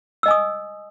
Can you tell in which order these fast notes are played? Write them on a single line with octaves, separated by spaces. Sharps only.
E6 D#5 G#5 D#6